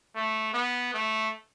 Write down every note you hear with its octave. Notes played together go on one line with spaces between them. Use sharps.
A3
B3
A3